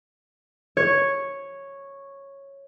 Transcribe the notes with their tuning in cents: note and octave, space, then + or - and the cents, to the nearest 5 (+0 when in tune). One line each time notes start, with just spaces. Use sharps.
C#5 -5